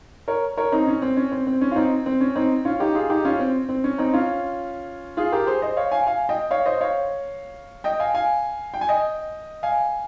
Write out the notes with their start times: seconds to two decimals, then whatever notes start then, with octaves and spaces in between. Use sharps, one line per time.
0.28 A#4 C#5
0.57 A#4 C#5
0.72 C4 D#4
0.87 C#4
1.02 C4
1.17 C#4
1.32 C4
1.47 C4
1.61 C#4
1.71 F4
1.76 C4 D#4
2.06 C4
2.21 C#4
2.35 C4 D#4
2.65 C#4 F4
2.80 D#4 G4
2.95 F4 G#4
3.10 D#4 G4
3.25 C#4 F4
3.39 C4
3.69 C4
3.84 C#4
3.98 C4 D#4
4.13 C#4 F4
5.17 F4 G#4
5.32 G4 A#4
5.47 G#4 C5
5.62 C5 D#5
5.77 C#5 F5
5.92 F5 G#5
6.07 F5 G#5
6.29 D#5 G5
6.51 C#5 F5
6.66 C5 D#5
6.81 C#5 F5
7.84 D#5 G5
8.00 F5 G#5
8.14 F5 G#5
8.74 G5
8.81 G#5
8.89 D#5 G5
9.63 F5 G#5